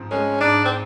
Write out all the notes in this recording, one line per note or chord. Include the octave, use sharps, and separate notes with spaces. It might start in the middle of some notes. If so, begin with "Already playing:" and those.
Already playing: G#2 F3 C4
G#3 C#4
G#2 D4
C4